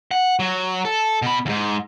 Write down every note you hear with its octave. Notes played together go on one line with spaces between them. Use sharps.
F#5
F#3
A4
B2 B5
E2 G#2